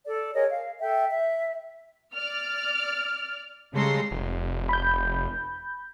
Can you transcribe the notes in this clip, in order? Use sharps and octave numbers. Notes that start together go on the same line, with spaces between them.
A4 D5
G#4 A#4 C#5 D#5
F5
A4 E5 G5
E5
D5 F6
C#3 G3 G#3 A4 A#5 C6
F1
B5 G6